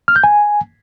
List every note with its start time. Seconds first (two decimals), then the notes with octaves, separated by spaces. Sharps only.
0.08 F6
0.16 G6
0.24 G#5